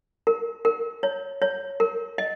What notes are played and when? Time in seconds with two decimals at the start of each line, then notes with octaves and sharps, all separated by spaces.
0.27 A#4
0.65 A#4
1.03 C#5
1.42 C#5
1.80 A#4
2.18 D#5